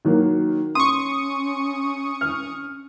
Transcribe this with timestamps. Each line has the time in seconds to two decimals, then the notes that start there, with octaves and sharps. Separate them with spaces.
0.05 D#3 F#3 A#3
0.75 C#4 C6 C#6 D#6
2.21 F6